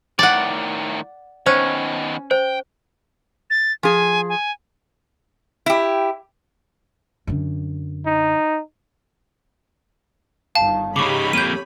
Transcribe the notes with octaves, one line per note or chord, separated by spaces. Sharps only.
A2 D#3 D5 F#5 G#5
D#3 B3 C#4 C5
C5 G5
A6
F3 G#4 G#5
G#5
E4 G4
F#2 D3
D#4
G1 D#3 F5 A5
C#3 D#4 G4 C#5 B5 C#6 D6
F2 A#3 G6 D#7